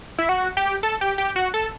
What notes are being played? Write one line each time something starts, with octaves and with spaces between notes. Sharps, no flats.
E4
F#4
G4
A4
G4
G4
F#4
A4